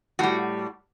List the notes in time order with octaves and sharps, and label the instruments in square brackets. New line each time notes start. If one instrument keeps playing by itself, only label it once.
[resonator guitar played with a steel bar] A2 G3 F#4